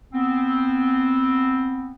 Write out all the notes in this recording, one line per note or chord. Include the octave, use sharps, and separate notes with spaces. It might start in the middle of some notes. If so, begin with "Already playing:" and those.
B3 C4